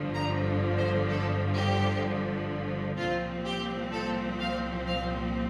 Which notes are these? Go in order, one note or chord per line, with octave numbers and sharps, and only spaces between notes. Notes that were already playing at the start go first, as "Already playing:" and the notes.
Already playing: G1 G2 D3 F3
A#5
C5
A4
G4
C2 A#2 F3 C4 F4
G4
A4
F5
F5